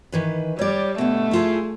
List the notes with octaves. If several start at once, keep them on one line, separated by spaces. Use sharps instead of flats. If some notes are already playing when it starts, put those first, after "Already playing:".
D#3 E3 B4
G3 C#5 D5
B2 D3 A3
E4 F4 G#4